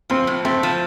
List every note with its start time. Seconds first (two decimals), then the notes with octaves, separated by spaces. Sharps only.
0.10 F3 C4
0.27 A2
0.45 A3 C4
0.63 F3